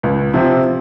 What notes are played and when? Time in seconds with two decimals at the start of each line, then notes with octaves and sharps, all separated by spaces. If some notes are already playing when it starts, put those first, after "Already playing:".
0.03 C#2
0.33 C3 F3 C4